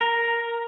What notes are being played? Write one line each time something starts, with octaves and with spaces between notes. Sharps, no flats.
A#4